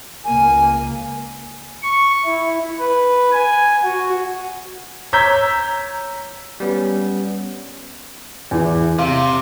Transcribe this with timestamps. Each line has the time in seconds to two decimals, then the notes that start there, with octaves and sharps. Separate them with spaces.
0.24 C#2 A#3 G#5
1.82 C#6
2.26 E4
2.78 B4
3.32 G#5
3.83 F#4
5.13 C#5 A#5 E6 G6 G#6 B6
6.60 G3 B3 C#4
8.51 E2 E3
8.98 C3 F5